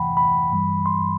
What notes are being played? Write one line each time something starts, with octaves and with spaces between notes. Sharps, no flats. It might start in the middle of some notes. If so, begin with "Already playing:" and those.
Already playing: E2 C3 E3 A3 F#5 G5 B5
B5
G2 E3 G3
C6